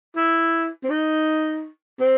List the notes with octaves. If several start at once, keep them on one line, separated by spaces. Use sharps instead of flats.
E4
C4
D#4
C4